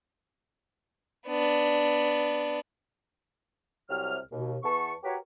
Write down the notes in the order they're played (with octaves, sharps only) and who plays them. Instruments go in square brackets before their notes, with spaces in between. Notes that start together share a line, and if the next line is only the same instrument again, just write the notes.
[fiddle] B3 D4
[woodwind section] C2 C3 F#3 F6
D#2 B2
E2 B3 A5 C#6
F#4 G4 A#4 B4 C#5